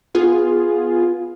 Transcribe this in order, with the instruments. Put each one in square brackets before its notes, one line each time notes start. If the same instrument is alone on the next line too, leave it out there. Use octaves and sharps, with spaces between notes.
[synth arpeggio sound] B3 F4 G#4